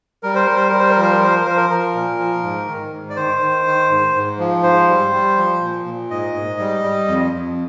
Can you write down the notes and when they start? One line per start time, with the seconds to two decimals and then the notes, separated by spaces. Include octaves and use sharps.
0.23 G3 A#4
0.35 C5
0.46 G3 A#4
0.57 C5
0.69 G3 A#4
0.79 C5
0.90 A#4
0.97 F3
1.02 C5
1.13 A#4
1.21 F3 C5
1.36 A#4
1.45 F3 C5
1.57 A#4
1.70 F3 A#4
1.95 A#2
2.19 F3
2.43 G#2
2.68 D#3
2.93 G#2
3.10 D5
3.16 D#3 C5
3.41 D#3
3.66 D#3
3.90 G#2
4.15 G#2
4.39 F3
4.63 G#2 C5
4.88 G3
5.12 G3
5.37 F3
5.61 A#2
5.85 A#2
6.11 G#2 D#5
6.34 G#2
6.60 G3
6.84 G3
7.08 F2
7.33 F2